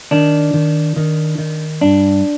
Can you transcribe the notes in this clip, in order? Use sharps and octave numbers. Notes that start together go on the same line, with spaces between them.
D#3 D4
D#3
D#3
D#3
G2 D4